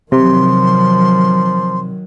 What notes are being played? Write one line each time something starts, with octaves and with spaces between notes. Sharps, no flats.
C3 D#3 F3 F#3 C6